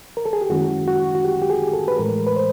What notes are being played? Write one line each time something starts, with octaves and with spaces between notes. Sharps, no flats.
A#4
A4
G#4
G4
F#2 D#3 G#3 C#4 E4 F#4
F#4
F#4
G4
G4
G#4
A4
B4
A2 E3 G#3 A#4
B4
C5